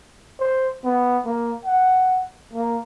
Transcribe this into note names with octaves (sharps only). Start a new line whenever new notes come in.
C5
B3
A#3
F#5
A#3